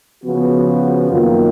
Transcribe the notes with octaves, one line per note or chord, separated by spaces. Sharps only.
C#3 F3 B3 F#4
F#2 D#3 A#3 F4